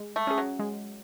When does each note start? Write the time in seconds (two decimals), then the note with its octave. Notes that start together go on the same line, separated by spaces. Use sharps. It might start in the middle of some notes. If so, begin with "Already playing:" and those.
Already playing: G#3
0.16 A3
0.27 C#4 G#4
0.38 F#3
0.59 G#3